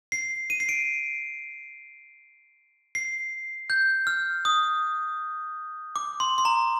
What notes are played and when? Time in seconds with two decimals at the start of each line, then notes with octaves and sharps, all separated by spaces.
0.12 C7
0.50 D#7
0.60 C7
0.69 D7
2.95 C7
3.70 G6
4.07 F6
4.45 D#6
5.96 D6
6.20 C6
6.38 C6
6.45 A#5